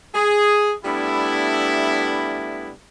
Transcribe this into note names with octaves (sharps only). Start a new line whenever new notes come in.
G#4
G3 A3 B3 D4 E4